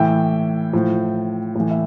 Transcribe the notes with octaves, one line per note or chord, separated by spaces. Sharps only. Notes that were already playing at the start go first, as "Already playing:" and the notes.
Already playing: A2 E3 E5 G5
A2 F3
A2 E3
E5